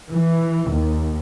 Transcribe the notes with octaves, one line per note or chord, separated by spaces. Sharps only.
E3
D#2